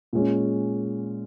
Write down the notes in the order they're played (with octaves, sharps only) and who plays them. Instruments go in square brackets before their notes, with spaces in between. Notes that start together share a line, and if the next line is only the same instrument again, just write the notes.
[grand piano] A#2 G#3 C#4